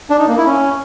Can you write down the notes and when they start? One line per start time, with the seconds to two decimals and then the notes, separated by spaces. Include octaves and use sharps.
0.10 D4
0.19 D#4
0.28 A#3
0.37 E4
0.46 C#4